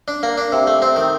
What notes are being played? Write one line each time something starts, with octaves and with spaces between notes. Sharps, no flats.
D4
A#3
D4
C3
A3
C4
D#3